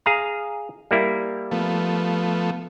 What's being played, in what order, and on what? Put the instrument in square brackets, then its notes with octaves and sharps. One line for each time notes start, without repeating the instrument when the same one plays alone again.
[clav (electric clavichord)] G#4 F5 A#5
G3 A#3 E4
[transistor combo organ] F3 A3 B3